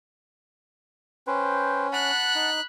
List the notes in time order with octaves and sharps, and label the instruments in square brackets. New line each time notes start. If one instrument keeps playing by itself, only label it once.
[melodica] C#4 [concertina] B4 C5 G5
[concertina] F#5 A5 [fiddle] B5 F#6
[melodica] D#4